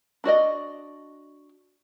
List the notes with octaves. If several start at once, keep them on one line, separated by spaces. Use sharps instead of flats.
D4 F#4 D5 D#5